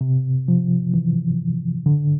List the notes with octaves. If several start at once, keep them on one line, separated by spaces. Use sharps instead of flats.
C3
F3
E3
D3